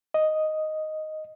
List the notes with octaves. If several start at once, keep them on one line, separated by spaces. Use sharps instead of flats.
D#5